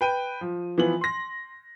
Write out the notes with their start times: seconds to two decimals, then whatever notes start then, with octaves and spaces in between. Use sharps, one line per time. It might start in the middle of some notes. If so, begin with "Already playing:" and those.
0.01 B4 G5 D#7
0.41 F3
0.78 E3 F3 B3 F#7
1.01 C6 A#6